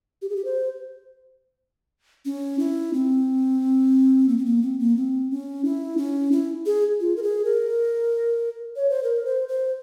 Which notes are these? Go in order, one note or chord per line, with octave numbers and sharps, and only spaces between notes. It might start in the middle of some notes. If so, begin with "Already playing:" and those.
G4
G#4
G4
C5
C#4
E4
C4
A#3
C4
A#3
C4
A#3
C4
C#4
E4
C#4
E4
G#4
F4
A#4
G#4
A#4
C#5
C5
A#4
C5
C5